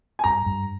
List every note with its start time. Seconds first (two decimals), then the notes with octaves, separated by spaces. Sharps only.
0.19 G#5
0.24 G2 A#5
0.46 G2